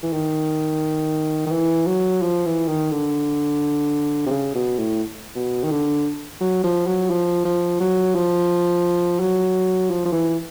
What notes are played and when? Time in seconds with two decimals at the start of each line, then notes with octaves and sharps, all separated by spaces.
0.03 E3
0.13 D#3
1.47 D#3
1.52 E3
1.87 F#3
2.22 F3
2.46 E3
2.68 D#3
2.91 D3
4.27 C3
4.31 C#3
4.55 B2
4.78 A2
5.36 B2
5.64 D#3
5.71 D3
6.41 F#3
6.64 F3
6.87 F#3
7.10 F3
7.45 F3
7.80 F#3
8.15 F3
9.20 F#3
9.90 F3
10.05 F3
10.12 E3